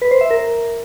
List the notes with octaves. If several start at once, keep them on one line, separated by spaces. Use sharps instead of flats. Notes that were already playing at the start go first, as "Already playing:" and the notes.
B4
C5
E5
A#4